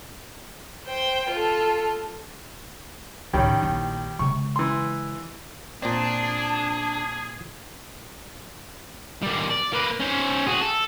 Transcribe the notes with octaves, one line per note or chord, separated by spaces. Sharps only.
C5 G5
F4 A4
C#2 A2 D#3 G3 C#4
A#1 E4
C#3 G#3 C#6
E3 C6
A#2 C4 D4 G#4 A5
G3 A#3
D5
A#3 B4
C#4 C5
F#4 G#4
A4